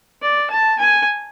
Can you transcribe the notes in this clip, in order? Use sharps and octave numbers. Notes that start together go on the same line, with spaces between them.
D5
A5
G#5